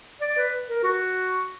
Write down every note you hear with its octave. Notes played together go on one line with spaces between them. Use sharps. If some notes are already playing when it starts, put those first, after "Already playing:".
D5
B4
A#4
F#4